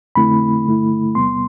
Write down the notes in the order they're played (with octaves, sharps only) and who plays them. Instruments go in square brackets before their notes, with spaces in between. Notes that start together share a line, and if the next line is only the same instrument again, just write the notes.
[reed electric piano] F2 D3 A3 C4 E4 B5
G2 D3 A3 E4
E2 C3 G3 B3 C6